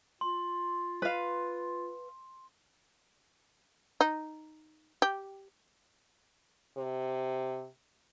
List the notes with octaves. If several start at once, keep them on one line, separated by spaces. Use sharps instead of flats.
F4 C6
B4 F5
D#4
G4
C3